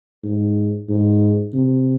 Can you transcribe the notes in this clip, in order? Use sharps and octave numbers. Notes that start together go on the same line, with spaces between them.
G#2
G#2
C3